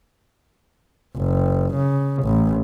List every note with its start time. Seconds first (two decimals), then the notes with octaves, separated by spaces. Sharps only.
1.16 F#1
1.75 C#3
2.23 A1